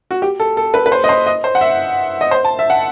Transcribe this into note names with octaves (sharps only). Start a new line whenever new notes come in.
F#4
G4
A4
A4
B4
B4
C5
D#5
C5
D#5
C5
F#5
E5
D#5
C5
A5
E5
F#5